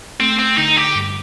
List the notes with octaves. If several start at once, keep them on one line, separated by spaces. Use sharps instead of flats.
A3 C4
C4
D3 D#4
G4
G2